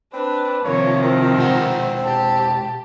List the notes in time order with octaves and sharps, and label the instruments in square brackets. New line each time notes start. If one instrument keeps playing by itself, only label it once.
[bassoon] C4 [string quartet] D4 [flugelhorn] B4
[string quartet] C3 D#3 F3 [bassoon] A#3 [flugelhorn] C#5
[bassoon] C4 [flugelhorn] A#4
[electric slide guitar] B2 G#3 F#5
[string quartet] G4 [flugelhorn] A5